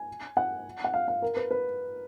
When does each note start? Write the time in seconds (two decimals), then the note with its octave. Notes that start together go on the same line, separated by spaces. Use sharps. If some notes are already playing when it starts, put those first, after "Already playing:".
Already playing: G#5
0.37 F#5
0.84 F#5
0.94 F5
1.08 F5
1.22 A#4
1.37 B4
1.51 B4